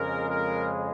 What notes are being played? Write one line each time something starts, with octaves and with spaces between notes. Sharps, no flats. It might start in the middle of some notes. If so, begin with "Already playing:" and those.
Already playing: F2 C#3 G#3 A#4
A#4